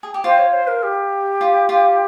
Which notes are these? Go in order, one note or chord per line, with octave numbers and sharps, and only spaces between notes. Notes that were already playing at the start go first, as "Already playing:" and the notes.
G#4
G4
F4 C5
C#5
C5
A#4
G4
F4
F4